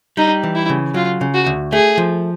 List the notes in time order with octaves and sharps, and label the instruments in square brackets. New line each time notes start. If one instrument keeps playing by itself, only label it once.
[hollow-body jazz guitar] G3 [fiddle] D#4
[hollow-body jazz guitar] E3
[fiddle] E4
[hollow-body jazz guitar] C#3
[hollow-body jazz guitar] F#3 [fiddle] F4
[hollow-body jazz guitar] C#3
[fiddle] F#4
[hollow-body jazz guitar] D2
[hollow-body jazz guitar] A3 [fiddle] G#4
[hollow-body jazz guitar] F3